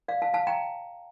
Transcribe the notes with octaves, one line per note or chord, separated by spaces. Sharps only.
D5 F5
F5 A5
F5 A5
G5 A#5